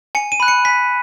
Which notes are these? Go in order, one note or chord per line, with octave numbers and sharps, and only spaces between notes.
G#5 C#7
D#7
B5 F#6
C#7
G#5 B6